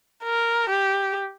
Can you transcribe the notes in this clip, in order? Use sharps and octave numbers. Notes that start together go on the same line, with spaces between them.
A#4
G4